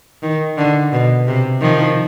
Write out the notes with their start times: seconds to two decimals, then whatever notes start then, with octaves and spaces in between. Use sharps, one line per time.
0.23 D#3
0.58 D3
0.92 B2
1.27 C3
1.61 D#3 F3